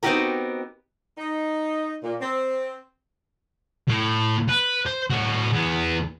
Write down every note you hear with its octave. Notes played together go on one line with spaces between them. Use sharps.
B3 C4 D#4 F#4 G4 A#4
D#4
A#2
C4
A2
B4
C5
A2 F#4
E2 B3